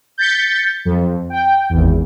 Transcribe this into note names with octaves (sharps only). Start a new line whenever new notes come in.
G6 A6 B6 C#7
F2
G5
G#1 E2